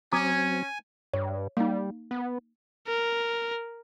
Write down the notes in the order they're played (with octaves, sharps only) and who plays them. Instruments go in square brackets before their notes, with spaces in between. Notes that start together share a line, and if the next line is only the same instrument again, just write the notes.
[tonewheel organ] F#3 C4 [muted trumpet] C#4 [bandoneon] G#5 [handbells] A#5 D6 D#6
[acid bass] G2 [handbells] C#5
[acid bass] G3 [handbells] A#3 D#4
[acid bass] B3
[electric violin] A#4